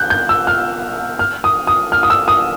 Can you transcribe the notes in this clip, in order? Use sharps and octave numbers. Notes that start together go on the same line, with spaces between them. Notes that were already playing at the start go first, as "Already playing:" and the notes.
Already playing: F#6 G6
G6
E6
F6
F6
D#6
D#6
F6
D#6
E6
D#6